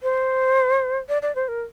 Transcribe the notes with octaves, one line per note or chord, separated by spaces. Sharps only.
C5
D5
D5
C5
A#4